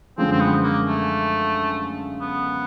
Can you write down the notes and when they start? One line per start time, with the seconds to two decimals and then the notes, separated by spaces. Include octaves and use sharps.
0.18 F#2 D3 F3 G#3 C4
0.32 C4
0.41 B3
0.63 A#3
0.86 A3
2.21 B3